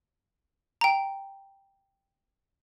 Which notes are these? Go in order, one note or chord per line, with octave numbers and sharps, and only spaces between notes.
G5 A#5